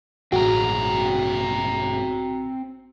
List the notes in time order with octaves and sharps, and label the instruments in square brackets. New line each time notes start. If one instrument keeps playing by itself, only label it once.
[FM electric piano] A1 F#4 [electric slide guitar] G2 B2 G#3 [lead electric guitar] C4 A#5